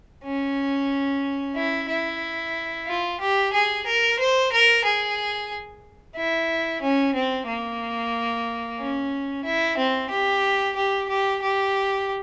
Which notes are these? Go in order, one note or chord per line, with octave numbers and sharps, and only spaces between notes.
C#4
E4
E4
F4
G4
G#4
A#4
C5
A#4
G#4
E4
C#4
C4
A#3
C#4
E4
C4
G4
G4
G4
G4